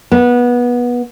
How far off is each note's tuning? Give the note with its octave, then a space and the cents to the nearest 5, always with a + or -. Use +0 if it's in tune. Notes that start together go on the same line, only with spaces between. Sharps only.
B3 -20